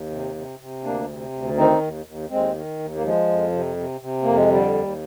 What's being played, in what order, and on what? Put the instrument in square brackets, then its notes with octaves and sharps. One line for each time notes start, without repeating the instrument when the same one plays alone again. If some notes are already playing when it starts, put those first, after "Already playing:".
Already playing: [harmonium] D#2
C3
C3
C3
D2 A#3 D4
C3
D2
D#3 C4 D#4
D#2
D#2
D#2 G#3 C4
D#3
D#2
A#3
F3 G#3
F2
C3
C3
C3
F2 A#3
G#3
D3 G3
D#2